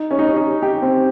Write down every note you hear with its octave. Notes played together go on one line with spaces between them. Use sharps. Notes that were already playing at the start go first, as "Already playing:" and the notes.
Already playing: D#4
C#4
D#4
C#4
D#4
G4
C4